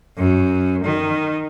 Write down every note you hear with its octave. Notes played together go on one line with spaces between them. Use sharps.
F#2
D#3